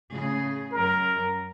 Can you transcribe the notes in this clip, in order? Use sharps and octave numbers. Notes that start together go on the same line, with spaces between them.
A2 C#3 G#4
F#2 A#4